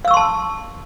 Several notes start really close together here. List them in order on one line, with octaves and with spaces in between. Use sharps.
F5 E6 C#6 C6 A5